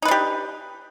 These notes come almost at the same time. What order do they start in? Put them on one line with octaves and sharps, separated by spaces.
D#4 B4 D4 G4